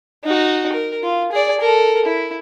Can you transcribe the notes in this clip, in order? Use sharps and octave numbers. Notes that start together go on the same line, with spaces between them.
D#4 F#4
A#4
F4
G#4 D5
A4 A#4
E4